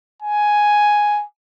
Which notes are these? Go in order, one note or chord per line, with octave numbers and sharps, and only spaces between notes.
G#5